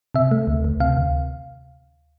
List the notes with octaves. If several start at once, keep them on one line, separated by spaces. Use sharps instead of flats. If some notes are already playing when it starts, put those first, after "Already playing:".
C3 E5
A3
D2
D2
C3 F5
D2